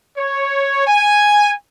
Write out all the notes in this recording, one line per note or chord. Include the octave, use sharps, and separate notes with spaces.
C#5
G#5